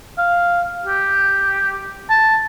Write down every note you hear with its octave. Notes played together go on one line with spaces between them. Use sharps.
F5
G4
A5